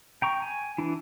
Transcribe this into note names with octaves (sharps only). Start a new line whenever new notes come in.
G5 A#5 C#6
G#5
E3 D4 E4